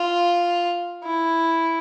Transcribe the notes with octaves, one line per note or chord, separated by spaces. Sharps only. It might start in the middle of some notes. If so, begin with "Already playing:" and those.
Already playing: F4
E4